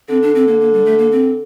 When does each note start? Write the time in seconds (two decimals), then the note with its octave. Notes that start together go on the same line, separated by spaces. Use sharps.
0.09 D3 C4
0.22 D4
0.35 C4
0.48 A#3
0.60 A#3
0.73 G3
0.86 A3
0.98 A#3
1.11 C4